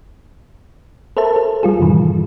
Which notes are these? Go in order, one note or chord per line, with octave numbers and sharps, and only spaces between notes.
A4 A#4 C5 E5 A5
A4
G3 F4 G#4
F#2 A2 C3 D#3 E3